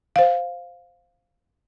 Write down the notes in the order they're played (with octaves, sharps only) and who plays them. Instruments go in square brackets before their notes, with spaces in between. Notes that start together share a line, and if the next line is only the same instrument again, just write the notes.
[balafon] C5 F5